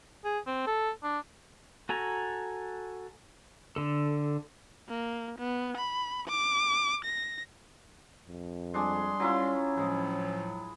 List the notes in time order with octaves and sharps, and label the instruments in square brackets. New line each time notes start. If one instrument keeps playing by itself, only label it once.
[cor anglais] G#4
C4
A4
D4
[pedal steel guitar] F#4 A4 G#5 A#5
D3 A4
[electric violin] A#3
B3
B5
D6
A#6
[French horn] F2
[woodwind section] G3 C6 [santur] G#3 D4 G#4
[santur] F#3 E4 F4 [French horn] C#4
[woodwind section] A2 F3 F#3 [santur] G#3